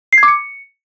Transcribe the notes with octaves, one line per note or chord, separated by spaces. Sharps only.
C7
G#6
D6
C#7